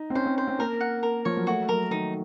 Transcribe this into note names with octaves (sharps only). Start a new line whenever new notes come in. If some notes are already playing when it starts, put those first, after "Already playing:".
Already playing: D#4
C4
C#4 C5
C4
C5
C4
A#3 A#4
F#5
A#4
F3 C#5
F#3
A3 F#4
F#3 A#4
D#3 D#4